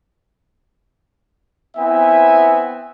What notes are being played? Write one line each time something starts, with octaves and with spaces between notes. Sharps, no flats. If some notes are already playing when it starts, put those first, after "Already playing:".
B3 C4 E4 E5 G#5